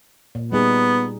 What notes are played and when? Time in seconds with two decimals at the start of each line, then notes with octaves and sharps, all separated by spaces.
0.35 A#2
0.52 G3 B3 D#4 G#4